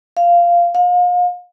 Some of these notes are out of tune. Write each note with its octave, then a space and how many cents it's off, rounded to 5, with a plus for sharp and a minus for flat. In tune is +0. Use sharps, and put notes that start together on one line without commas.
F5 -10
F5 +40